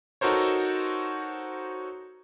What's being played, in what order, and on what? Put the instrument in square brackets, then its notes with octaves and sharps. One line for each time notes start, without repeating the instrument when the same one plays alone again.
[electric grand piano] D#4 F#4 A4 A#4 C5 C#5